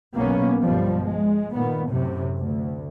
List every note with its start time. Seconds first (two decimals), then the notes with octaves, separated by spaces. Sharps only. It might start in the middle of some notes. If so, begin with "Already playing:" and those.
0.16 B1 A#3 B3 C#4
0.62 G1 B2 F3 G3
1.03 G#3
1.53 A#2 D#3 B3
1.89 F#2 A2 C3
2.36 D2